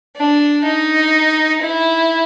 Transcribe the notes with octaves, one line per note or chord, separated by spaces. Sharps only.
D4
D#4
E4